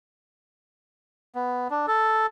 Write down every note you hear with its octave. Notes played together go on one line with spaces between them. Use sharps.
B3
D4
A4